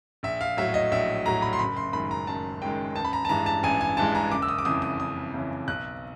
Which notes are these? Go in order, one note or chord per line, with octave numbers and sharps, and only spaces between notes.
A#1 E5
F5
A2 F#3 E5
D#5
A#1 E5
A2 F#3 A#5
B5
C6
F#1 B5
C6
F#2 D#3 G#3 B5
A#5
F#1 A5
F#2 D#3 G#3 G5
A1 A5
B5
A#5
A5
G2 E3 G#3 A#5
A5
A1 G#5
G#5
G2 E3 G#3 A5
A#5
F#1 D6
E6
D#6
D6
F2 C#3 E3 D#6
D#6
F#1 D#6
F2 C#3 E3
B1 F#6